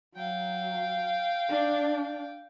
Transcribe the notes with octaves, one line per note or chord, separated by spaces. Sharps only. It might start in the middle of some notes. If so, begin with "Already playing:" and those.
F#3 F5 G5
D4